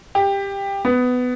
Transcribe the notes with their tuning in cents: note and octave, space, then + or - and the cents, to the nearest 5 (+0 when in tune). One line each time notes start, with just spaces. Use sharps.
G4 +15
B3 +15